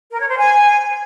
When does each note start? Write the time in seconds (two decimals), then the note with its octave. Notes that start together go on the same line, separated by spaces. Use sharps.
0.11 A#4
0.20 C#5
0.28 C5
0.37 G#5